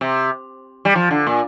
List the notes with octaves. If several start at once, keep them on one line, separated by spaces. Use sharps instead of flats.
C3
G3
F3
D3
A#2